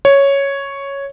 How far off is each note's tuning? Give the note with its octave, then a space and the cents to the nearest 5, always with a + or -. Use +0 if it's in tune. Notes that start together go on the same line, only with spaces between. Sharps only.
C#5 +0